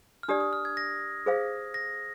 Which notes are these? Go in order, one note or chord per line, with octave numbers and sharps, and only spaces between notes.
F6
D4 G4 D5 D#6
D#6
F6
G#6
A#6
G#4 C5 F5
A#6